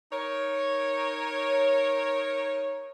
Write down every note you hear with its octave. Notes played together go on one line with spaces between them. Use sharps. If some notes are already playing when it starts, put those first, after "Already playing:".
D#4 A#4 C#5